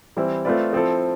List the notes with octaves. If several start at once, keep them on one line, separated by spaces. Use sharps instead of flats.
E3 G3 C4 E4
A3 C4 F4 B4 D5
F3 C4 E4 A4